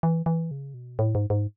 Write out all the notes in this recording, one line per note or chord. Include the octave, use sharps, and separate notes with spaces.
E3
E3
C#3
B2
A2
G#2
G#2